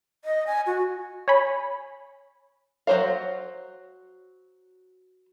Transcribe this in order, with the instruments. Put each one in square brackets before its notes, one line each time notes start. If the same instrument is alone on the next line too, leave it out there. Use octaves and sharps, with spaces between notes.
[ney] D#5
G#5
F#4
[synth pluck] C#5 G#5 B5
[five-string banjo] F#3 D#4 C5 C#5 F5